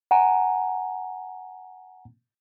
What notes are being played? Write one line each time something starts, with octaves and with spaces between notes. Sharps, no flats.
F#5 G#5 A#5